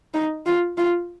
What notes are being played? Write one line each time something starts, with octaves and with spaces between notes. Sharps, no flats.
D#4
F4
F4